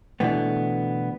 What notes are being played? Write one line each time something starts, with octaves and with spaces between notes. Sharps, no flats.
B2 D3 E3 A3 B3